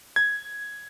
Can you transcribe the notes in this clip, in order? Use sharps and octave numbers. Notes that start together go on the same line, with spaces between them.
G#6